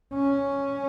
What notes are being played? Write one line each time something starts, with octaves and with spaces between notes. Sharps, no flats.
C#4